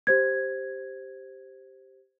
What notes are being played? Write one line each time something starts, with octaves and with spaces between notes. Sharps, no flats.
G4 C5 G#6